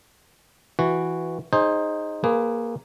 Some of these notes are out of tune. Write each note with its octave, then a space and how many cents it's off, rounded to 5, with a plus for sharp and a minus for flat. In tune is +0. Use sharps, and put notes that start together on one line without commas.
E3 +0 F#4 +0
D#4 +0 G#4 +0 C5 +20
A#3 +0 G#4 -10 B4 +25